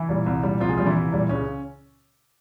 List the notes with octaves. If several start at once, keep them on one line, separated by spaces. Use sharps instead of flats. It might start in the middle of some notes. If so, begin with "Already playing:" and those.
Already playing: E3 E4
A#2 G3
C2
A#2 G3
C2 F3 F4
G#3 G#4
A#2 F3 G3 F4
E3 E4
C2
A#2 G3
C#2 C#3 C#4